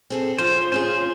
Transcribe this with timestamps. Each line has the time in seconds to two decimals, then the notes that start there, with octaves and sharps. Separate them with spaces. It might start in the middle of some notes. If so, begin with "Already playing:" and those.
0.10 C4 G#4 A4
0.38 F3 C#4 C5
0.72 C#4 F4 G#4 C5